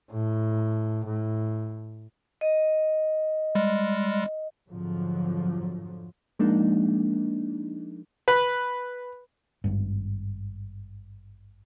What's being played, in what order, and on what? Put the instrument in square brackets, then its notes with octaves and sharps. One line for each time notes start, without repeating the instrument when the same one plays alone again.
[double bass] A2
A2
[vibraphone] D#5
[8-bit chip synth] G3 G#3
[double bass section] F2 G#2 D3 F3 F#3
[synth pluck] F3 G#3 A#3 D4 D#4
[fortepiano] B4
[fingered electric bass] G#1 G2